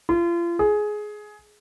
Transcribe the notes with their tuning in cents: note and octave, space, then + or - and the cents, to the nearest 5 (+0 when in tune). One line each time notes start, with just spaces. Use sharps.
F4 -35
G#4 +15